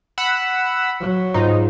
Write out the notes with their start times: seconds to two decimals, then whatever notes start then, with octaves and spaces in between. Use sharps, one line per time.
0.18 F#5 B5 E6
1.00 F#3
1.34 G#2 D#4 F4